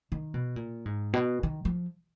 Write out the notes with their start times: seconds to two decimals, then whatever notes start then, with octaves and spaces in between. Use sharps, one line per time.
0.12 D#3
0.34 B2
0.56 A#2
0.86 G#2
1.13 B2
1.43 D#3
1.65 F3